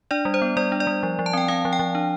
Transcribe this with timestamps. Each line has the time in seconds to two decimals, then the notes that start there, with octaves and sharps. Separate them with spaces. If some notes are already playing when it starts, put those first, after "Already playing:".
0.11 D4 D5
0.25 G3
0.34 C5
0.42 B3
0.57 G3 D5
0.72 D4
0.80 D5
0.87 G3
1.03 F3
1.19 F3
1.26 A5
1.33 C4 G5
1.48 C4 F5
1.65 F3
1.73 G5
1.79 F3
1.95 D4